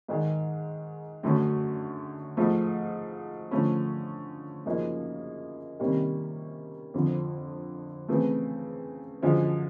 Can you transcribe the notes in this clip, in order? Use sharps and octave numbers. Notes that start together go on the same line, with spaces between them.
G#2 D#3 G#3
F#2 D3 F#3 A3 C#4
G#2 F3 A3
D3 F3 A3 C#4
F#2 C#3 F3 A#3 D#4
C3 D#3 G3 A#3 C#4
F2 D3 F3
C#3 E3 A3 C4
F#2 D3 F3 G#3